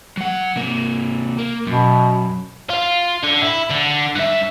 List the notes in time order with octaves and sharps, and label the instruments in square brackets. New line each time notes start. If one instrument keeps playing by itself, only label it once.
[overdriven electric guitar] F#3 F#5
C3 A#3
A#3
[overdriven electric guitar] F#2 [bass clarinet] B2
[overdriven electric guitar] F4
D3
E4
D3
G2 E5